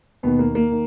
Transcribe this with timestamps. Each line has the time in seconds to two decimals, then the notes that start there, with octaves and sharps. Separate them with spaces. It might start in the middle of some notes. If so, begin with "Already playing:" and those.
0.23 D#2 B2 D#3 B3
0.39 A#3
0.55 A#3
0.71 D#3